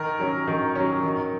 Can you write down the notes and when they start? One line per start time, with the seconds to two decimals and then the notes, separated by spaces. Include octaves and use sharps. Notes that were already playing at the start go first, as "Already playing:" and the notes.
Already playing: D#3 A#4
0.19 F#3 C#4
0.47 D#3
0.75 F#3 C#4
1.03 D#3